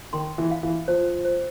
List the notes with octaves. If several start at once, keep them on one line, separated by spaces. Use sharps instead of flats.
D#3 C6
E3
F5
E3
F3 C5
C5